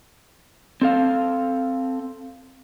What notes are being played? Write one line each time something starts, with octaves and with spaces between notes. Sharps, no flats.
C4 A4 F5